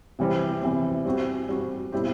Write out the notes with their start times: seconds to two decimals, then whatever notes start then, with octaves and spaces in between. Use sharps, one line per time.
0.19 C3 E3 G3 C4
0.62 C3 E3 G3 C4
1.05 G3 C4 F#4
1.49 G3 C4 F#4
1.92 B2 G3 C4 E4 G4